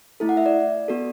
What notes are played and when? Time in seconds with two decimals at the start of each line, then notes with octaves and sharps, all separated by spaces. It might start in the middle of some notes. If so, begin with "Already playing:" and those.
0.20 A3 E4 A4
0.29 F#5
0.37 E5
0.46 D5
0.88 B3 F#4 A4